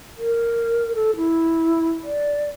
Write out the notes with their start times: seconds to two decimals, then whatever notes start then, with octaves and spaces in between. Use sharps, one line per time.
0.18 A#4
0.95 A4
1.16 E4
2.04 D5